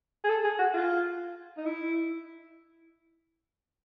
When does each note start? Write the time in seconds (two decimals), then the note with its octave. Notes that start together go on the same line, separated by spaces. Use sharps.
0.24 G#4
0.29 A4
0.44 G#4
0.59 F#4
0.74 F4
1.58 D#4
1.66 E4